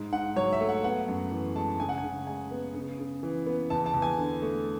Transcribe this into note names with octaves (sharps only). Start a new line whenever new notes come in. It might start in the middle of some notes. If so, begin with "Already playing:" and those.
Already playing: G#2
G#2 F#5
F#3 C#5
E5
A3
F#5
B3 F#5
F#2
E3
G#3 A5
C#3 G#5
F#5
G#5
C#3
G#3 G#5
B3
C#3
C#3
E3
B3
E2 A5
A5
E2
G#5
D3
A3